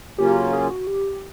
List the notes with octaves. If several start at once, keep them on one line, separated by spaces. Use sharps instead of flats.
C#3 F#3 A#3 C#4 F4 G4
G#4
F#4
G4